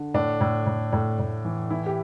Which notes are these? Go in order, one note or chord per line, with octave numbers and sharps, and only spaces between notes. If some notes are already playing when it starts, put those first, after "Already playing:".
Already playing: D3
A2 D4
A2
A2
A2
A2
E3
E3 E4
G4